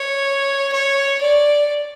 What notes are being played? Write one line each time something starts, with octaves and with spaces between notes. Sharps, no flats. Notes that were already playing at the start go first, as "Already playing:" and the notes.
Already playing: C#5
C#5
D5